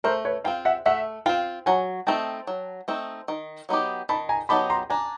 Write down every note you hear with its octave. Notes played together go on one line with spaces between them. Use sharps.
A3 A#4 C5
B4 C#5
C4 F4 F5 G5
E5 F#5
A3 E5 F#5
C4 F4 F5 G5
F#3 F#5 G#5
A3 C4 D#4 G5 A5
F#3
A3 C4 D#4
D#3
F#3 B3 D#4 G4
D#3 A5 B5
G#5 A#5
F#3 B3 D#4 G4 A5 B5
A#5 C6
D4 G#5 A#5